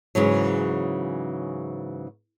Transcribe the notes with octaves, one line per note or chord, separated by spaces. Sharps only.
G#2 C#3 E3 F#3